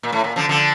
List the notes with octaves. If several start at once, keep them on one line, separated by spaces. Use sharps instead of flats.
A#2
A2
A#2
D3 F3
D3 F3